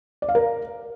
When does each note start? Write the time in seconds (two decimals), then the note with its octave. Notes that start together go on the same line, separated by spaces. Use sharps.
0.22 D5
0.29 F5
0.35 A#4